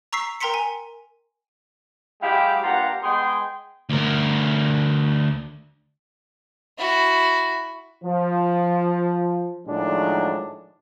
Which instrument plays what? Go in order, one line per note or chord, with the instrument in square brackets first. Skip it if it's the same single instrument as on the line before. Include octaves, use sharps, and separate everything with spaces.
[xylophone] A#5 C#6 E6 B6 C7
A#4 G5 A#5 C6 B6 C#7
G#5
[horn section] F#3 G#3 E4 G4 F5 G5
G2 A#3 F4 G4 F#5 A#5
G#3 B3 G#4 G5 C6
[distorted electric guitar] D2 A#4
[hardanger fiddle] E4 F#4
[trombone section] F3
A2 D#3 F3 F#3 G#3 D4